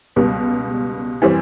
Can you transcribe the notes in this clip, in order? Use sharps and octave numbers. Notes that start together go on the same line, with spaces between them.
C#2 B2 G3
E3 G3 C4